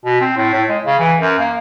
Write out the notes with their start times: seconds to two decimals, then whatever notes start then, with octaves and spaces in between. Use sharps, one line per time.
0.05 B2
0.21 C4
0.37 A2
0.54 A2
0.69 G#3
0.86 C#3
0.99 E3
1.18 F#2
1.39 A#3